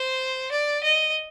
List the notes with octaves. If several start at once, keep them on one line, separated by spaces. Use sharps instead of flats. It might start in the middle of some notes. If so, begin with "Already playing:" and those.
Already playing: C5
D5
D#5